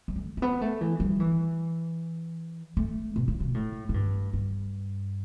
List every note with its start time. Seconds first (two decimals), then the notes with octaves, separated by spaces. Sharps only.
0.08 G3
0.16 A3
0.37 A3
0.42 B3
0.61 A3
0.81 E3
1.00 G3
1.20 E3
2.77 A3
3.16 B2
3.28 A2
3.40 B2
3.54 A2
3.89 A2
3.94 G2
4.33 G2